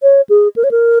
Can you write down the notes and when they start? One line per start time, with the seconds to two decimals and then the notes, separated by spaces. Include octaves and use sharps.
0.03 C#5
0.29 G#4
0.56 A#4
0.64 C#5
0.71 A#4